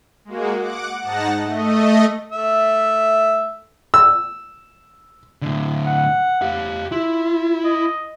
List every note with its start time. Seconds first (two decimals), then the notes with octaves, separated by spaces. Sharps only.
0.25 G#3 A#3 F#4
0.58 F#5 D6
1.01 G#2 D#4 F#5 A5 A#6
1.43 A3 D#5
2.33 A3 E5
3.94 E6
5.42 A2 D3
5.87 F#5
6.42 G4 F5
6.92 E4 F4
7.64 D#5